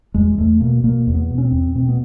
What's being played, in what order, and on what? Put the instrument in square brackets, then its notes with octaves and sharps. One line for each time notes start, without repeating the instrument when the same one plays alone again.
[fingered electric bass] E2 G#3
E2 A3
B2 A#3
B2 A#3
E2
B3
B2
C#4
C4
E2
B2 C4
B3